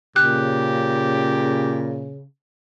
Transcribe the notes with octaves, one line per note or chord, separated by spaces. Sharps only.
A#2 C#3 G4 F#6